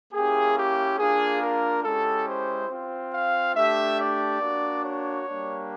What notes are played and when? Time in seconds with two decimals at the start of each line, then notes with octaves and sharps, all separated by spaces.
0.14 A#3 C#4 E4 G4 G#4
0.57 G4
0.99 A#3 D4 F4 G#4
1.41 A#4
1.84 G#3 C#4 E4 G4 A4
2.27 C5
2.70 C4 F4
3.12 F5
3.55 A3 D4 G4 E5
3.98 D5
4.41 A#3 D4 F#4
4.83 C#5
5.26 G3 A#3 D4